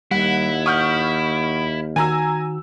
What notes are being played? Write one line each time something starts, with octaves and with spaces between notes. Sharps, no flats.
D#2 G3 E4 F#5
F#5 C#6 D#6 F6 G6
D#3 F#4 G#5 A#5 E6